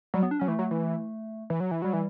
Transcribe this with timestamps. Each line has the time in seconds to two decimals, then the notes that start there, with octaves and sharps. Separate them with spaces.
0.14 F#3 G3
0.23 B3
0.31 D4
0.40 F#3 C#4
0.48 E3 A3
0.59 F#3
0.71 E3
1.50 E3
1.60 F#3
1.71 E3
1.82 F#3 G3
1.93 E3